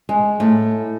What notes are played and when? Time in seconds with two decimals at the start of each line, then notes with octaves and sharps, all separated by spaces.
0.09 G#3
0.40 A2